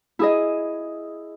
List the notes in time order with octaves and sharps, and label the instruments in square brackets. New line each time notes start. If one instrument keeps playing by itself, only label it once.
[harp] E4 G#4 D#5